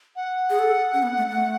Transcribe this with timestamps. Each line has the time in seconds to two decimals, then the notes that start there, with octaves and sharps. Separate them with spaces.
0.16 F#5
0.50 G#4
0.59 A4
0.93 C#4
1.03 B3
1.17 A3
1.30 A3